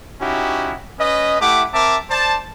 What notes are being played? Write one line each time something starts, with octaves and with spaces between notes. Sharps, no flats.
C#4 D#4 E4 F#4 G4
C#4 B4 D#5
A3 E4 G4 F#5 D6
C4 A#4 E5 A5 D6
C5 D5 A5